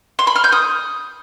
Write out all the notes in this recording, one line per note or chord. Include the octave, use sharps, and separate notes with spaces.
C6
B5
F6
G6
D#6